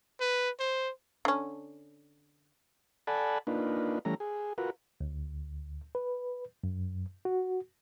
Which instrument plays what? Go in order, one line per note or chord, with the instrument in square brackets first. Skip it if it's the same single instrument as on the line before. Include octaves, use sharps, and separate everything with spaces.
[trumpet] B4
C5
[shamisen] D3 C#4
[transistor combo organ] A4 D5 F#5 G#5 A5 B5
A#3 D4 D#4 F4 B4
E3 G3 A3 C#4 A#5
G#4
F4 F#4 A#4 B4
[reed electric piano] D2
B4
F#2
F#4